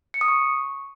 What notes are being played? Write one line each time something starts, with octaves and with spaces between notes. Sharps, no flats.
C#7
D#6
C#6